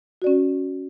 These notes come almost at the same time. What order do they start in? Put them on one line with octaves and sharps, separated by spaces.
F#4 D5 C#4